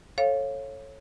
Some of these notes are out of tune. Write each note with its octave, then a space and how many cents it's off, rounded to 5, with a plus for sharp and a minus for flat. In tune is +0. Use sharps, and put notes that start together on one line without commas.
A4 +0 C#5 -20 F5 +0